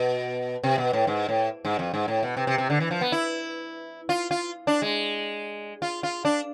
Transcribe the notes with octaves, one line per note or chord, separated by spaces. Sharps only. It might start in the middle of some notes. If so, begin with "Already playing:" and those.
Already playing: B2
C3
B2
A2
G#2
A2
G#2
F2
G#2
A2
B2
C3
C3
C3
D3
E3
F3
B3
E4
F4
F4
D4
G#3
F4
F4
D4